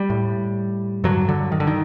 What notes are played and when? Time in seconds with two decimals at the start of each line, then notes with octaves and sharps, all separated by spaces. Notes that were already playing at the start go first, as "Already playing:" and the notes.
Already playing: G3
0.10 A2
1.04 G2 D3 F#3
1.29 D3
1.52 D#3
1.60 D3
1.67 D#3